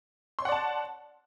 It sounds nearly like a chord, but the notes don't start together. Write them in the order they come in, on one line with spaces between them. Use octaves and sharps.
C6 C#5 F#5 D5 A5